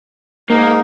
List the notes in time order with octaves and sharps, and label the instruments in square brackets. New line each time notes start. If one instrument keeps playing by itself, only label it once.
[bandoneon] G#2 D#4 [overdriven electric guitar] A#3